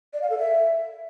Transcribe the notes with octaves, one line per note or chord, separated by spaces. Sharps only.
D5
F5
A4
E5